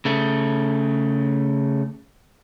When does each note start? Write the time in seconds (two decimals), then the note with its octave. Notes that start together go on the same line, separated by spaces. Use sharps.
0.05 C#3 A3